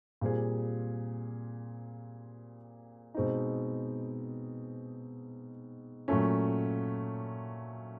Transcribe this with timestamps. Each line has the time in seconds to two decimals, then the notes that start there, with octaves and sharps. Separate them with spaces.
0.21 A#2 G3 C4 F4 G#4
3.14 B2 G#3 C4 D#4
6.08 A#2 F#3 A3 C#4